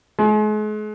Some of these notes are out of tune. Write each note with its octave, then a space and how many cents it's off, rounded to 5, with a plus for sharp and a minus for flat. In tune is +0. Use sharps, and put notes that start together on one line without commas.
G#3 +40